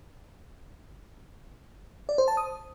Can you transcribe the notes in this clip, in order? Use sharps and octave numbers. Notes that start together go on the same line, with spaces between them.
D5
C5
A5
D#6